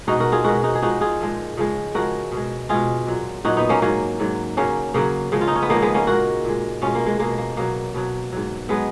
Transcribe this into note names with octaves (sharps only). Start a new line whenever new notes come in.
B2 G#3 D#4 F#4
F#4 A#4
F4 G#4
B2 G#3 F#4 A#4
D#4 F#4
G#4
A#2 F3 G#3 D#4 F#4
F4 G#4
A#2 F3 G#3
C#3 F3 G#3
C#3 F3 G#3 F#4 A#4
B2 G#3
B2 G#3 F4 G#4
A#2 F#3
A#2 F#3 D#4 F#4
B3 D#4
A#3 C#4
G#2 F#3 A#3 C#4
G#2 F#3
C#3 F#3 A#3 C#4
C#3 F#3 A#3
C#3 F3 G#3
F4
D#4
C#4
B3
C#3 F3 G#3 A#3
G#3 B3
A#3 C#4
A#2 G#3 F#4 A#4
A#2 G#3
B2 G#3 C#4 F4
A#3
G#3
B2 G#3 A#3
A#3
B2 F#3 A#3
B2 F#3
G#2 F#3
F#3 G#3 B3